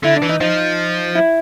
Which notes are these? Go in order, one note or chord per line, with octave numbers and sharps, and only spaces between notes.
D3 E4
D4
E3
D#4
F3 D#4
E4